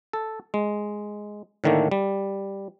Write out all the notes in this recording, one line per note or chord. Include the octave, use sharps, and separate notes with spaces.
A4
G#3
A2 D3 D#3 A3 A#3
G3